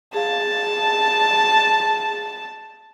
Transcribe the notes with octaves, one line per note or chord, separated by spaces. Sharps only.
G#4 F5 A5